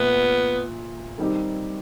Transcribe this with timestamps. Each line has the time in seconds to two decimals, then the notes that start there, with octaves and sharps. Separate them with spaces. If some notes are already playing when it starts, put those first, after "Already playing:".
Already playing: A#2 F3 A3 B3
1.18 D#3 G3 C4 D#4 G4